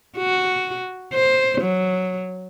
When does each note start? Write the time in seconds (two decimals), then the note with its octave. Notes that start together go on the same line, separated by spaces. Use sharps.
0.17 F#4
1.13 C5
1.61 F#3